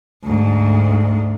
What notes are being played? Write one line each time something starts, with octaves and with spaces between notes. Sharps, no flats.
D2 G#2